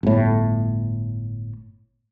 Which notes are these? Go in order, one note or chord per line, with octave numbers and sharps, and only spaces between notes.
G1 A2